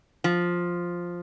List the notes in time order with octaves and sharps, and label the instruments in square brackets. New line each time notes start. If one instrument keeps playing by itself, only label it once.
[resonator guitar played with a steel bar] F3